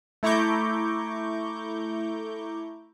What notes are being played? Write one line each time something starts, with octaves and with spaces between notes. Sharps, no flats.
A3 E4 A#5 C#6 D6 G6